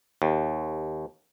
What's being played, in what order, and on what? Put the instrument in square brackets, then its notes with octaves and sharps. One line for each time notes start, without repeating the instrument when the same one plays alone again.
[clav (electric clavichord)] D#2